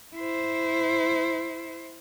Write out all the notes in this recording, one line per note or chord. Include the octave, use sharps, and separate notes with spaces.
E4 C5